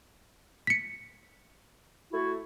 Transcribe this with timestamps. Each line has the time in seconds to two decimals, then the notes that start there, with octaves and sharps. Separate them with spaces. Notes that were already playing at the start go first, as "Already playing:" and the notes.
0.67 B6 C#7
2.13 A3 E4 F#4